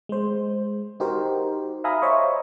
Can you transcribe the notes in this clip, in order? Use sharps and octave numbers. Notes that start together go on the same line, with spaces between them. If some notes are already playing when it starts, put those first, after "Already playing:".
G#3 C5
D#4 F#4 G4 A#4 C5
E5 F5 G#5 A#5 B5 D#6
C5 C#5 D#5 E5 C#6